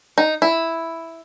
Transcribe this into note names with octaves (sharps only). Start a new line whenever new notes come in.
D#4
E4